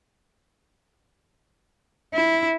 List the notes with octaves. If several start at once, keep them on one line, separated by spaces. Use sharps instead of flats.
E4